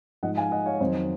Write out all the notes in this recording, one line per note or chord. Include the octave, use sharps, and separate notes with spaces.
G#2 F3 G#3 D#5 F#5
F5 G#5
D#5 F#5
C#5 F5
F2 D#3 F#3 C5 D#5